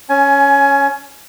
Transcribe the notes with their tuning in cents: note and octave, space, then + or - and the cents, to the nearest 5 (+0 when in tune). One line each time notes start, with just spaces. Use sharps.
C#4 +0 G#5 +20